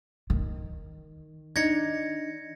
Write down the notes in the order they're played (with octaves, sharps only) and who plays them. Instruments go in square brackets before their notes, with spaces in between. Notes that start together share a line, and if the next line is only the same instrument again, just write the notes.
[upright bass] D#3
[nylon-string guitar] D4 D#4 [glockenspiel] G#6 A#6 C#7